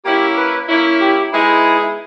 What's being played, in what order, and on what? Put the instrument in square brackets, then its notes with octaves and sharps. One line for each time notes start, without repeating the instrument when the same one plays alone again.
[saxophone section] A#3 C#4 E4 [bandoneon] G4
[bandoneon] B4
[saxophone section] A#3 C#4 E4
[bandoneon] G4
[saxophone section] G#3 B3 D#4 G#4 [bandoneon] E4